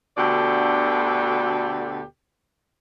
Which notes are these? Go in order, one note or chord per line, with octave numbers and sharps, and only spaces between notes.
D2 B2 D3 G4 A4 D5